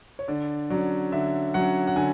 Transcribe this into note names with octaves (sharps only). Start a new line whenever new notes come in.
C#5
D3 D5
F#3 C#4 D5
D3 E5
F#3 C#4 F#5
F#5
D3 G#5